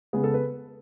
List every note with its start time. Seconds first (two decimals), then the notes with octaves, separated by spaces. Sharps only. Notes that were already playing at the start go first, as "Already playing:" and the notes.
0.13 C#3 G#3 B3 G#4
0.24 A4
0.34 B4